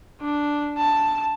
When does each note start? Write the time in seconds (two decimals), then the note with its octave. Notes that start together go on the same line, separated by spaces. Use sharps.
0.21 D4
0.78 A5